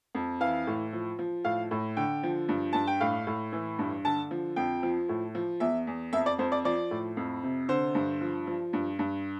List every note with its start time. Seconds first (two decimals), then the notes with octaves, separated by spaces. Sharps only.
0.15 F2
0.41 E3 F5
0.67 A2
0.93 F3
1.19 F3
1.45 A2 F5
1.71 A2
1.97 D3 G5
2.23 F3
2.49 G2
2.73 G2 A5
2.87 G5
3.00 A2 F5
3.27 A2
3.52 E3
3.79 G2
4.05 D3 A5
4.31 F3
4.56 F2 G5
4.83 F3
5.09 A2
5.35 F3
5.60 E2 E5
5.87 E2
6.13 F2 E5
6.26 D5
6.39 F2 C5
6.52 D5
6.65 F3 D5
6.91 A2
7.17 F2
7.43 C3
7.69 D3 C5
7.95 G2
8.21 F3
8.47 F3
8.73 G2
8.99 G2